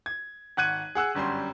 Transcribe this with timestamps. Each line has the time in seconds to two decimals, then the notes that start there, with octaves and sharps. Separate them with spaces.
0.06 G#6
0.57 G#1 F#5 F#6 G#6 D#7
0.95 G#4 F#5 E6 F#6
1.15 G1 F#2 G3 C6